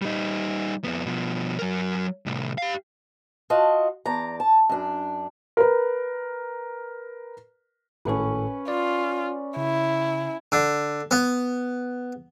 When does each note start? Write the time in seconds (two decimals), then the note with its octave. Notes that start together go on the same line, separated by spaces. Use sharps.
0.02 G3 D#4
0.84 F2 B3
1.05 B2 F3
1.59 F#3 A#4
2.26 C2 A2
2.58 G4 F5
3.50 F4 F#4 D#5 A5
4.06 E2 D5 A#5
4.40 A5
4.69 F#2 D4
5.57 A#4 B4
8.05 G#1 A2 C#4 A4 B4
8.68 F4 D5
9.57 C#3 E4
10.52 D3
11.11 B3